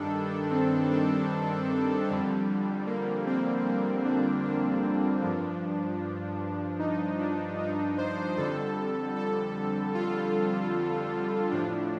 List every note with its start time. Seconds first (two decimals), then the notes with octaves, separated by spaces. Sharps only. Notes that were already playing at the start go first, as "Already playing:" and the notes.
Already playing: G2 D#3 G3 D4 A4
0.51 C4
0.91 C4
2.08 F2 D3 G3
2.87 A#3
3.26 C4
3.65 A#3
4.05 D4
4.44 D4
5.22 G2 F3
6.79 D#4
7.19 D4
7.58 D#4
7.98 C5
8.37 F2 D3 G3 A4
9.16 A4
9.94 F4
11.51 A2 F3 D4